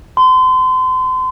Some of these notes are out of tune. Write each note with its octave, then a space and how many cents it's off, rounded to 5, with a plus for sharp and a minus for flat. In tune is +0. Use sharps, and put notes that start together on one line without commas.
C6 -35